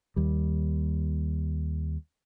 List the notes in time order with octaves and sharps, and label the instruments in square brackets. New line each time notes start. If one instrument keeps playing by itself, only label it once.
[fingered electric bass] D#2 G3